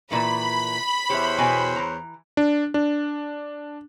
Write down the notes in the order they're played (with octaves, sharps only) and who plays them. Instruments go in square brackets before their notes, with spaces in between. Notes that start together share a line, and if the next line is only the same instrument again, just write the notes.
[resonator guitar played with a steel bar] A#2 E3 A3 [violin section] B5
[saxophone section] E2 C5 C#5 [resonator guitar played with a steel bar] G4 E5
[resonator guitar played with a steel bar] B2 G5 G#5
E3 A#5
[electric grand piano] D4
D4